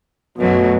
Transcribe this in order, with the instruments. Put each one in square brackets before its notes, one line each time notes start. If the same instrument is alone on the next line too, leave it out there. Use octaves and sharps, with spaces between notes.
[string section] F#2 F#3 A3 [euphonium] B2